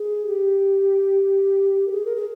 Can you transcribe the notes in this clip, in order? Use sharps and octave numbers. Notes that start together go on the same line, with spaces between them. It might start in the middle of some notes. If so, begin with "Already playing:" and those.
Already playing: G#4
G4
A#4
G#4
A#4
G#4